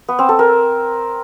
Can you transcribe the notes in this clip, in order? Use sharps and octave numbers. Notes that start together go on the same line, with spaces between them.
B3
C4
A4
A#4